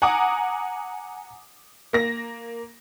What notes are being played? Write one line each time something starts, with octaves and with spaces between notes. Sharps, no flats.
F#5 G#5 A#5 D6 D#6
A#3 A#6